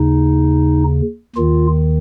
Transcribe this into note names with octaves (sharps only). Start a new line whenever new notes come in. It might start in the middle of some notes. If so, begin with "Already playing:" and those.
Already playing: D#2 C#3 D#4
D#2 D#3 F4